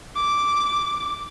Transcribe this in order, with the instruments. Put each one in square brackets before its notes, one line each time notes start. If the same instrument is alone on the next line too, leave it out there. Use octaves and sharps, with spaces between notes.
[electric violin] D6